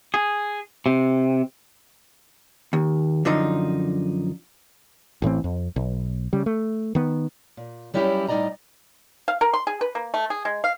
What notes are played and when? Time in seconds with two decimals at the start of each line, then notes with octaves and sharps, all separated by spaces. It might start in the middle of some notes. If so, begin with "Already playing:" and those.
0.14 G#4
0.86 C3
2.73 D#2
3.25 F#2 D3 F3 D#4
5.22 A1 A2 E3 C4
5.44 F2
5.76 B1
6.33 C#3 G3
6.46 A3
6.95 D#3 B3
7.57 A#2
7.94 F#3 G3 C#4 D4 E4 G4
8.29 A2 G3 D#4 D5 D#5 A#5
9.28 F5
9.41 A#4
9.54 C6
9.67 G#4
9.81 B4
9.95 A#3
10.14 A3
10.30 G#4
10.45 G#3
10.64 F5